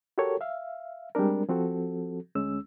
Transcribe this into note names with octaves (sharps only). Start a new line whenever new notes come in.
F#4 G4 A4 A#4 C#5
E5 F5
G3 G#3 C4 D4 A#4
F3 C4 F#4 A4
D2 G#3 C#4 E6